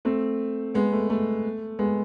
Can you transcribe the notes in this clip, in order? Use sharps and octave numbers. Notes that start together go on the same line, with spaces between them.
A3 C4
G#3 B3
A3
A3
G#3 B3